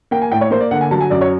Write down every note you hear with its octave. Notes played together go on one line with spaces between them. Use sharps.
A#3 G5
G#5
A2 G5
C#5
A#3 C5
D5
D3 F#5
G#5
F#3 A5
G#5
F#2 D5
C#5